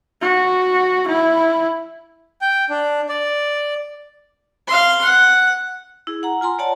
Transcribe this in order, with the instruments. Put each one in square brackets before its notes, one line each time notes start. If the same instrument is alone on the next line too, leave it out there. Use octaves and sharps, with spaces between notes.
[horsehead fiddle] F#4
E4
[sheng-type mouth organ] G5
D4
D5
[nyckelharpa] F5 C6
F#5
[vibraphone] E4 G#4
F#5 A#5
F4 G#5 A#5 C6
C#5 D5 F#5 A5